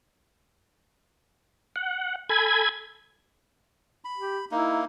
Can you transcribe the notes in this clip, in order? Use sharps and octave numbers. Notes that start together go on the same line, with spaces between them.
F#5
A4 G#5 B5 G#6
B5
G4
A#3 D#4 E4